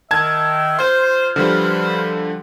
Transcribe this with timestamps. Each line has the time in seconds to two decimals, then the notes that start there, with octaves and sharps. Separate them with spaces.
0.11 D#3 E5 A5 G#6
0.79 F4 C5 C6 G6
1.36 D3 F3 G3 B4 C5